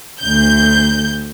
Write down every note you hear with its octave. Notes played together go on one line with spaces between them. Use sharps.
D2 G6